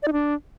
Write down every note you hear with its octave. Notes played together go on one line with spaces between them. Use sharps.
D5
D#4
D4